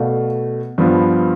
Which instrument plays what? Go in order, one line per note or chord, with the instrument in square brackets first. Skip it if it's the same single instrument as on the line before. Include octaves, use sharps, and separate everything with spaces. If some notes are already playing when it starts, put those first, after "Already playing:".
Already playing: [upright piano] B2 A3 D5 F5
G2 F3 B3